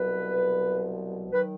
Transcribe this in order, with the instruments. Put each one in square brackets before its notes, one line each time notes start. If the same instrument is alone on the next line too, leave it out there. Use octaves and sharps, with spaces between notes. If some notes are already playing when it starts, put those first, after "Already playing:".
Already playing: [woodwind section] C2 B2 F#3 B4
D#3 F#3 B4